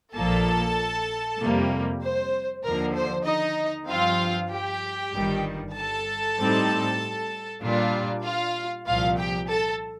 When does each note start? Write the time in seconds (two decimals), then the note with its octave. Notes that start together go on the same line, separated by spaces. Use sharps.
0.14 A#1 A#2 F3 A#3 A4 A5
1.39 F2 C3 G3 A#3
2.01 C5
2.64 D#2 D3 F3 A#4
2.95 C5
3.26 D#4 D#5
3.88 G2 F3 C4 F4 F5
4.50 G4 G5
5.13 G1 G2 D#3 G3
5.75 A4 A5
6.38 A2 G3 C4 D#4
7.62 A#2 G3 D4 F4
8.24 F4 F5
8.87 C2 A#2 F3 F4 F5
9.18 G4 G5
9.49 A4 A5